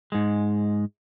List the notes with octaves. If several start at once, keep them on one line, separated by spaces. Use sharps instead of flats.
G#2 G#3